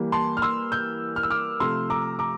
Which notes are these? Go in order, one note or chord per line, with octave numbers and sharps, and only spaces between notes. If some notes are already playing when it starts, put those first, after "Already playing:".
Already playing: E3 G3 A#3
A5 C6
F6
C6 E6
E6 G6
F6
E6
D6 F6
C3 F3 A3 C6 E6
A#5 D6
A#5 D6